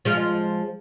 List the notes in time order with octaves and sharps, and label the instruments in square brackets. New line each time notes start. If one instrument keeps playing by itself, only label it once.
[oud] F3 G#3 F4